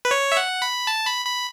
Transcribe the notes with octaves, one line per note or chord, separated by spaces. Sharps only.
B4
C#5
E5
F#5
B5
A5
B5
B5